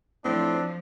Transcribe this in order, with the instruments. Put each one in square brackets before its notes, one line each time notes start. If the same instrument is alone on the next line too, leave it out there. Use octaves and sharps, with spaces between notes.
[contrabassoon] A2 [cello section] F3 [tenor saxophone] C4 [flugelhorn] D4